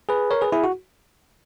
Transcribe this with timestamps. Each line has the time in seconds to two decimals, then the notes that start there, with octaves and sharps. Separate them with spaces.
0.09 G#4 B4
0.31 A#4 C#5
0.41 G#4 B4
0.52 E4 G#4
0.64 F#4